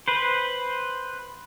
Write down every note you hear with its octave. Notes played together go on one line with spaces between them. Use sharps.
B4 C5